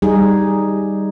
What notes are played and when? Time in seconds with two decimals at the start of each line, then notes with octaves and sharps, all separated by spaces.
0.02 G3 D#4 G#4